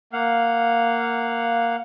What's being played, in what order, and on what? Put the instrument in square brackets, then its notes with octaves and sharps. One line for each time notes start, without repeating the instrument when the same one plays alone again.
[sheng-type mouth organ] A#3 F5 F#5